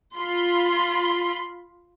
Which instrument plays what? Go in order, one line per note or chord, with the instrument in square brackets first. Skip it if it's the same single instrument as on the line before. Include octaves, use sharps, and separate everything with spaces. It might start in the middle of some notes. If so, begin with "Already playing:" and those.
[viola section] F4 B5 C6